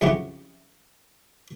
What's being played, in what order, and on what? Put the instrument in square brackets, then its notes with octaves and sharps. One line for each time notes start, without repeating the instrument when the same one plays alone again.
[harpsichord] F2 C#3 E4 F#4 G4 F#5